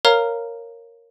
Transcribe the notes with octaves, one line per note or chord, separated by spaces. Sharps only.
A#4 C#5 F5 A#5 F6